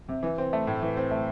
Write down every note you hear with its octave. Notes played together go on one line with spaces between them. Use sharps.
C3
E3
C4
A3
A2
E3
C4
A3